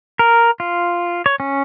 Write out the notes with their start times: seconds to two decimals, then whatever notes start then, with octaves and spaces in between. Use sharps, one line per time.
0.19 A#4
0.60 F4
1.26 C#5
1.40 C#4